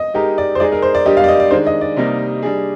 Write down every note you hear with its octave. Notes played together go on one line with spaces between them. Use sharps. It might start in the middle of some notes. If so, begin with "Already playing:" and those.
Already playing: D#5
G#3 D#4 G4 A#4 D#5
D5
C5
G#3 D#4 G#4 D5
A#4
C5
D5
G3 D4 G4 D#5
F5
D5
D#5
D5
D#3 G#3 D4 C5
D#5
D5
C3 G3 A#3 D#4
G3 D4 G#4